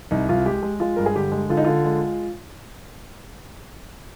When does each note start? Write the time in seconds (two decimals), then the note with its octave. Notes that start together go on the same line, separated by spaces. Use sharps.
0.11 C2 D#4
0.29 C2 F4
0.46 G#3 G4
0.63 G#3
0.80 G#3 F4
0.96 G2 A#4
1.06 G#4
1.16 D3 G4
1.32 G#3
1.49 D3 F4
1.57 D#4
1.65 D3 F4
1.85 G#3